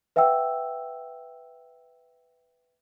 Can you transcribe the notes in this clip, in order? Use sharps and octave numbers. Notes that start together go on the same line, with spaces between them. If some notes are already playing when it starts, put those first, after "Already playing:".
B4 E5 F#5 G5 E6